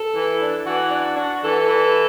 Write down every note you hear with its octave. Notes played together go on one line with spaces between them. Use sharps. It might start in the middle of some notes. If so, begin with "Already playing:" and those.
Already playing: A4
E3
D4
E3 F#4
D4
D4
E3 A4
E3